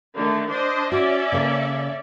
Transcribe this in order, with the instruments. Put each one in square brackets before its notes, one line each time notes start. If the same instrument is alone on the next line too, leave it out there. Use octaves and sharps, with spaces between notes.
[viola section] D3 D#3 A3
D4 C5 D#5
[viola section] C#4 D5 E5 [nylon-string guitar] F#4
[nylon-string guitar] C#3 A#3 A4